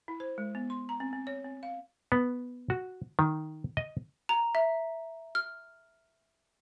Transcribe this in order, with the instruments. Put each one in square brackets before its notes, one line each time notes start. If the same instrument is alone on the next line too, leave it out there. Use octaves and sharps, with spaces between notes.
[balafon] E4
C5
G#3
B3
C6
A#5
C4
C4
C#5
C4
F5
[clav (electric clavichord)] B3
F#4
D#3
D#5
[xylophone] A#5
E5
F6